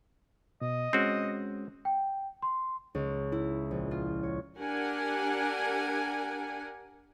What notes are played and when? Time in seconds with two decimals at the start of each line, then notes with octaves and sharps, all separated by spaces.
0.61 B2 D#5
0.93 G#3 C4 C#4 F#4
1.85 G5
2.42 C6
2.95 C#2
3.32 E4
3.71 A#1
3.91 F4
4.23 C#5
4.58 D4 G4 A#4 F#5 G#5